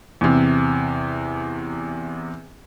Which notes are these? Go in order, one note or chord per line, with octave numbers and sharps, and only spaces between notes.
E2 C3